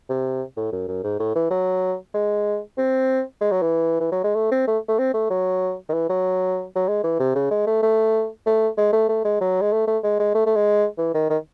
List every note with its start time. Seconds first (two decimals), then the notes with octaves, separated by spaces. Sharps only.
0.09 C3
0.57 A2
0.72 F#2
0.88 F#2
1.04 G#2
1.20 A2
1.36 E3
1.51 F#3
2.14 G#3
2.78 C4
3.41 G#3
3.52 F#3
3.62 E3
4.01 E3
4.12 F#3
4.24 G#3
4.35 A3
4.52 C4
4.67 A3
4.88 A3
4.99 C4
5.14 A3
5.30 F#3
5.89 D#3
5.94 E3
6.09 F#3
6.76 F#3
6.88 G#3
7.04 E3
7.20 C3
7.35 C#3
7.51 G#3
7.67 A3
7.83 A3
8.46 A3
8.78 G#3
8.93 A3
9.09 A3
9.25 G#3
9.41 F#3
9.62 G#3
9.72 A3
9.88 A3
10.04 G#3
10.20 G#3
10.35 A3
10.46 A3
10.56 G#3
10.98 E3
11.14 D#3
11.30 D#3